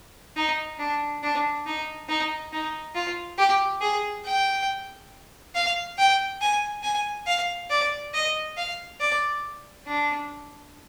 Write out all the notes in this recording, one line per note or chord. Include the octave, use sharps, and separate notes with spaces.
D#4
D4
D4
D#4
D#4
D#4
F4
G4
G#4
G5
F5
G5
G#5
G#5
F5
D5
D#5
F5
D5
D4